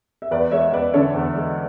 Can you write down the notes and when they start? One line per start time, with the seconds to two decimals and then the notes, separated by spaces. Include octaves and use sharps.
0.22 E5
0.31 E2 B4 D5
0.52 G#3 C#5 E5
0.73 E2 B4 D5
0.94 D3 A4 C#5
1.14 E2
1.35 G#3